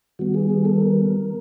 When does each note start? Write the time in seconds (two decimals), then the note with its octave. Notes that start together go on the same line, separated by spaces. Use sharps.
0.19 D#3 G3 B3 F#4
0.34 G#4
0.50 G#4
0.65 A4
0.80 A#4